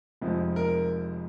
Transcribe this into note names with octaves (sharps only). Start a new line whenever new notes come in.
F1 F2 F3 G#3
A#4